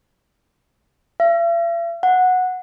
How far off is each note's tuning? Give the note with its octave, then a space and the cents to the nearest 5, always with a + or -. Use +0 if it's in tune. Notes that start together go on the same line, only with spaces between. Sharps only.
E5 +45
F#5 -10